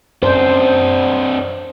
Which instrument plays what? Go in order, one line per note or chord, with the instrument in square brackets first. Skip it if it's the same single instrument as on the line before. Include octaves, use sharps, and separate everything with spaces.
[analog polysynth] F#2 [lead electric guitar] C4 D4 [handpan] C5